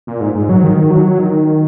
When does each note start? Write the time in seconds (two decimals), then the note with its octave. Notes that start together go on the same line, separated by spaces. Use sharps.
0.07 A#2
0.21 G#2
0.35 G#2
0.49 F#3
0.63 D#3
0.90 F#3
1.19 D#3